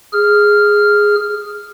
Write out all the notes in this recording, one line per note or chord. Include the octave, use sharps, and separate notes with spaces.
G#4 F6